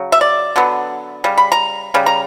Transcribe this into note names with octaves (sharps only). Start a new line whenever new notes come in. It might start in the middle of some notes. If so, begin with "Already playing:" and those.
Already playing: C#3 F#3
E5
D5
D3 F#3 B3
C#3 G3
B5
A#5
C#3 G3
A#5